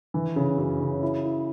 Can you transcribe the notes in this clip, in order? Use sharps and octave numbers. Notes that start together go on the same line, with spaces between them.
E3
C#3
F#2
C#3
E4
E4